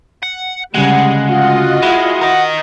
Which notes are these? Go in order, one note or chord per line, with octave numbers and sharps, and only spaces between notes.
F#5
D2 C#3 G3 G#3 F#5
F4 F#4 D#5
G#3 E4
A#4 D#5